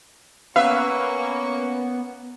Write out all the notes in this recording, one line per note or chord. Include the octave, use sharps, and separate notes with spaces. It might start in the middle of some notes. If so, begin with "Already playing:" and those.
A#3 B3 C#4 B4 E5 F5 C#6